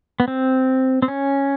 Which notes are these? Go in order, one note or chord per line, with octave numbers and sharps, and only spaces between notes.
B3
C4
C4
C#4